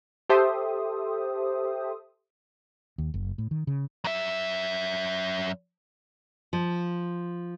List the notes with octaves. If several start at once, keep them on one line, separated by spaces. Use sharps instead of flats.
G4 A4 C5 E5 D#6
D#2
F#1
A2
D#3
C#3
F#2 E5
F3